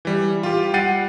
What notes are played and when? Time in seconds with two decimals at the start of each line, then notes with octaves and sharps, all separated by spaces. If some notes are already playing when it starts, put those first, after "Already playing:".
0.05 E3 G3
0.43 F4 G4
0.74 G3 F#5 G5 A6 C7 D#7